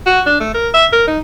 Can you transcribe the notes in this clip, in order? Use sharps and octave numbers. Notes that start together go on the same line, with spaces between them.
F#4
D4
A3
A#4
E5
A#4
D#4